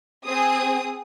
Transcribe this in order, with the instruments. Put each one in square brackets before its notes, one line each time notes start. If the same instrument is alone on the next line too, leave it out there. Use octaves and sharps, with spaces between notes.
[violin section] C4 G#4 D#6